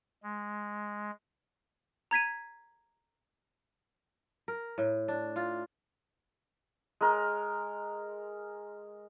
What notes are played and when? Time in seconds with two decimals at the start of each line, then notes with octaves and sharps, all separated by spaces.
0.23 G#3
2.11 A#5 G#6 B6 D#7
4.48 A#4
4.78 A2
5.08 D4
5.36 F4
7.01 G#3 A#4